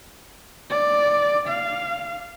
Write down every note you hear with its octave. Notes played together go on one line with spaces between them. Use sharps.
D5
F5